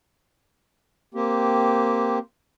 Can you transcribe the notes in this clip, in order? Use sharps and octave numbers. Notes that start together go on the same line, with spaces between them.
A#3 C4 G4